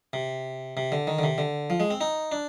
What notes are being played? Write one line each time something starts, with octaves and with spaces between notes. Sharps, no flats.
C3
C3
D3
D#3
D3
C3
D3
F3
G#3
C4
D#4
D4